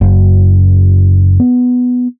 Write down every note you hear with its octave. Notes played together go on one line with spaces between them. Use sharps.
F#1
B3